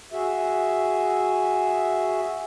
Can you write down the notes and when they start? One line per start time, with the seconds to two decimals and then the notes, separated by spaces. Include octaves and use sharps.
0.12 F#4 G#4 E5